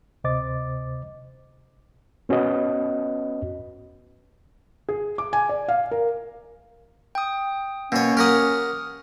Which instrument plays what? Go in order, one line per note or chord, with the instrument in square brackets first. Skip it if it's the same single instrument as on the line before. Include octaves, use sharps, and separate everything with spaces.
[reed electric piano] D2 C3 C5 D#5 D6 A6
B3 C#4 F#4 B4 D#5
[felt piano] G#4
D6
G#5
D5
F5
A#4
[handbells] G5 D#6
[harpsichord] B2 C#5 [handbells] A#3 [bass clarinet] C#4
[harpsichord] G4 A#4 F#5 [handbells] D#6 F6